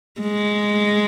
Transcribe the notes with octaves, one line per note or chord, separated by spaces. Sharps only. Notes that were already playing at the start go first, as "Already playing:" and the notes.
G#3